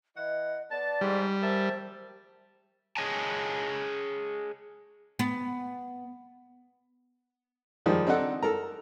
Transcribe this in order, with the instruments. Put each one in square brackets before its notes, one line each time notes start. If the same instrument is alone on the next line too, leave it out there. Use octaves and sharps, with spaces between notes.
[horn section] E3 E4 F#5 [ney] D#5
[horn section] B3 A5 [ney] D5
[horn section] G#2 [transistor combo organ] G3
[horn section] A#4 E5 A5 [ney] C5
[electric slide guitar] G#4 C#5 D#5 G#5 A5
[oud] B3
[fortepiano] D#3 F3 G3 G#3
C4 D4 D#4 A4 F#5
A4 A#4 A#5